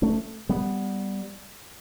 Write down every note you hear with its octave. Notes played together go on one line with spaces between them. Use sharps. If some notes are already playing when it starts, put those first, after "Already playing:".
A3 C#4
G3 B3